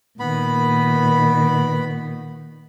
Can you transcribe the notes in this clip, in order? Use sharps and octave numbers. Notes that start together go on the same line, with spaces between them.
A#2 D#3 B3 B5